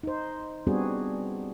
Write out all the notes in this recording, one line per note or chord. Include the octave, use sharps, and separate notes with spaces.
D#4 C5
G3 B3 C4 D4 F#4 G#4